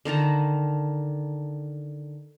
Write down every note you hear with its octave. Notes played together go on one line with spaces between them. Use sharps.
D3 D#3 A5 A#5